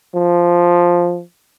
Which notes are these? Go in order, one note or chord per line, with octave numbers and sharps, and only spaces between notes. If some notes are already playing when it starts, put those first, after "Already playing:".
F3